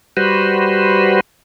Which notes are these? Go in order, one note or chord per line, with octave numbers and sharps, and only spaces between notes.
G3 F#4 B4 C5